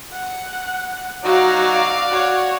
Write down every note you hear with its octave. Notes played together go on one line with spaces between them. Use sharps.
F#5
F#3 D#4 F#4 D5 F5
F#4 C#5